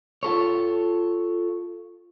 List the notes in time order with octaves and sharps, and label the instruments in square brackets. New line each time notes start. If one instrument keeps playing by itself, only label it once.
[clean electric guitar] F4 A4 C#5